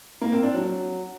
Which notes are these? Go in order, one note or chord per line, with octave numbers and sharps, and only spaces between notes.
A#3
C4
D4
F#3